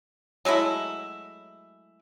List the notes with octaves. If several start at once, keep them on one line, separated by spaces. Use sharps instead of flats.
F#3 G#3 A3 E4